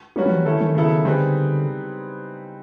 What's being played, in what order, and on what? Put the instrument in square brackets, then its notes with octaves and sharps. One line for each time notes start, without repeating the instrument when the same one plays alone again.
[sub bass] F#3 [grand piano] G3 A#3 C#4 F#4 B4
[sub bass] F3
E3
[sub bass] D#3 [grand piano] A3 C#4 E4 A4
[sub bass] D#3
[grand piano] C#3 F#3 B3 E4 A4
[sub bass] D3 [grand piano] G3 C4 D#4 G#4 B4